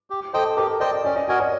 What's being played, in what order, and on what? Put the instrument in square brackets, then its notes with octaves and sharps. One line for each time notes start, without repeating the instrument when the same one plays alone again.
[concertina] G4
[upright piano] A4 [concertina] C5 D#5 G5
[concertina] G4 [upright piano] A#4
[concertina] C5 D#5 G5 [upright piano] D5
[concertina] C#4 [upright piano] D5
[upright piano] D#5
[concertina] F#4 A#4 D#5 G#5 [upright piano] D5
[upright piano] C#5